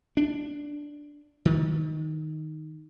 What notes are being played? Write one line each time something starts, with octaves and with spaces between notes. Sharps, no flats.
D4
D#3